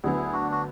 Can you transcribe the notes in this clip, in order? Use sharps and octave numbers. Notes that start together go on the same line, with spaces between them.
D2 D3 F#3 B3 E4 G#4
D4 F#4
F#4